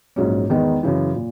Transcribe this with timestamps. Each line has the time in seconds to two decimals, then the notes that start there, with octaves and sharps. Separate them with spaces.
0.16 A#1 G#2 F#3 C#4
0.50 E2 D#3 G#3 B3 D#4
0.83 F#2 C#3 E3
1.15 A#2